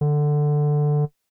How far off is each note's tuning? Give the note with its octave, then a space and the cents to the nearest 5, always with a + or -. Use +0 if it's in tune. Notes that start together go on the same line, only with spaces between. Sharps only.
D3 +10